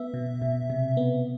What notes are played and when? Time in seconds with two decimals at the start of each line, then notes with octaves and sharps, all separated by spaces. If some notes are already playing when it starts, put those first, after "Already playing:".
Already playing: B3 E5
0.14 B2
0.42 B2
0.70 C3
0.97 B3